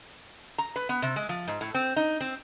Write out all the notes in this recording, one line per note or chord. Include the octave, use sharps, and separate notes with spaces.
A#5
B4
B3
C3
G#3
F3
G#2
A2
C4
D#4
C4